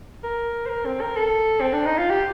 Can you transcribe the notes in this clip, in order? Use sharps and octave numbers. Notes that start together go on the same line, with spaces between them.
A#4
C5
A#4
C4
A#4
A4
C4
D4
D#4
F4
G4